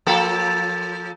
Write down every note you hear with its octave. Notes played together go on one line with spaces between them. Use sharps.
F3 A#3 A4